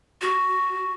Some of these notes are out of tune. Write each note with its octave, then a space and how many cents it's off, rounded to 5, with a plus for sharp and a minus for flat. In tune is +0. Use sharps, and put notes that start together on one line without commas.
F#4 +5